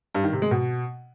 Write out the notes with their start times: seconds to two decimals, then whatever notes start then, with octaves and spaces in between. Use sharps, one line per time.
0.15 G2
0.24 D#3
0.33 C3
0.42 G#3
0.51 B2